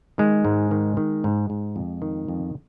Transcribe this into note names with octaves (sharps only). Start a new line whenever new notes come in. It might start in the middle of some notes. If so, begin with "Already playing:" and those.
D#3 G#3
G#2
D#3
D#3
G#2
G#2
F2
D#3
F2